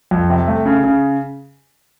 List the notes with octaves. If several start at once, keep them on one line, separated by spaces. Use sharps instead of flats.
F2
C3
A3
C#3
C#3